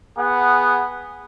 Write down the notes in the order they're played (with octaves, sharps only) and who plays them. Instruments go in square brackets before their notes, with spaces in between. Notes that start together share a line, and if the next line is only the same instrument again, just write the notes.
[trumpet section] B3 G#4 F#5